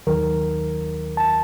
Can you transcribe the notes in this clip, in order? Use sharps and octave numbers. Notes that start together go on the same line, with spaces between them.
D#2 D#3 F#3 A#4
A5